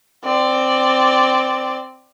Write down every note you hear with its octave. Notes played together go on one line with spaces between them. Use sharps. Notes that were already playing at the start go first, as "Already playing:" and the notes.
C4 D5